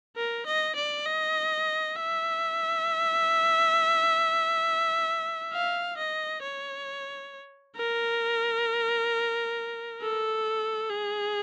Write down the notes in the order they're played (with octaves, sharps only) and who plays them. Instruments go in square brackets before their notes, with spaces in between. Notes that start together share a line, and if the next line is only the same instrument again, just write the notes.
[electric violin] A#4
D#5
D5
D#5
E5
F5
D#5
C#5
A#4
A4
G#4